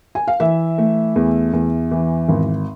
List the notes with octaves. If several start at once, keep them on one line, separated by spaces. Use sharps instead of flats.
G#5
F5
E3 E5
A3
E2
E2
E3
G#1